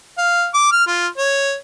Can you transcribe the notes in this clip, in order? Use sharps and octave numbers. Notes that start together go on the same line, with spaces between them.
F5
D6
F6
F4
C#5